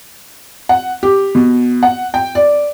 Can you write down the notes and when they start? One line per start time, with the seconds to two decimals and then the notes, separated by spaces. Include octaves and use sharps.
0.69 F#5
1.03 G4
1.35 B2
1.83 F#5
2.14 G5
2.35 D5